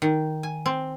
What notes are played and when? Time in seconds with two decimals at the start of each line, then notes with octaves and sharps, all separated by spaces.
0.02 D#3
0.43 G#5
0.66 C4